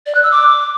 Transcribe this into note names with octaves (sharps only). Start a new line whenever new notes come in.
D5
F#6
E6
D6